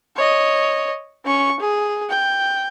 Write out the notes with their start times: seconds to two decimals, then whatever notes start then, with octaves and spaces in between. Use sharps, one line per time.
0.16 C#5 D#5
1.26 C#4 C#6
1.60 G#4
2.10 G5